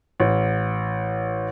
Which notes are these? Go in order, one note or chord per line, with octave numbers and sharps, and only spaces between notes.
A1